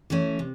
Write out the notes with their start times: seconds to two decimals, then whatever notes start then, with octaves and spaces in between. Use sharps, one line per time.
0.10 E3 A3 C#4
0.39 C3